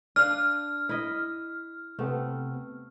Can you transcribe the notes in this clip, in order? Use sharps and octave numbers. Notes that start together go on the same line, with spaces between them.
D4 F5 F6
E4 D#5
C3 A3 B3 C4